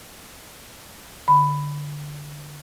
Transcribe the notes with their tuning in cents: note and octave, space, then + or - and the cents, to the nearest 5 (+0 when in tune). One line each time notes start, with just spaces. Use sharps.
D3 +0 B5 +10